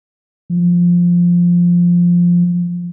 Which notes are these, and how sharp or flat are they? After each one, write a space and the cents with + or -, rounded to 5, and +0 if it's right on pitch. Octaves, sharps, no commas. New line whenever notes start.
F3 +0